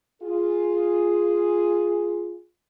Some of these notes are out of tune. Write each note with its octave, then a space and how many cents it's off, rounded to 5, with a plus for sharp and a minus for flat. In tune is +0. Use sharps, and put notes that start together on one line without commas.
F4 +0 G#4 +0